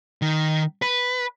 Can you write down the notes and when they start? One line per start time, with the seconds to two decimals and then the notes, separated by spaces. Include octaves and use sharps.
0.22 D#3
0.82 B4